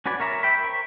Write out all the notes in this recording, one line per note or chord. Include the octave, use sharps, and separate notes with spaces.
C#4 F#4 B4 D5 G#5
A#4 C#5 E5 A#5
E5 G5 B5
A#4 C5 C#6